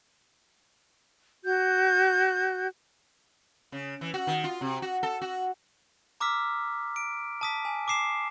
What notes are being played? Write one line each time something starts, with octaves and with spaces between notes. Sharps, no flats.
F#4 G6
C#3
E3
F#4
D#3
F4
C3
F#4
A4
F#4
A#5 D6 E6 F6 B6
D7
A5 D#6 B6
G#5
D6 D#6 C7 E7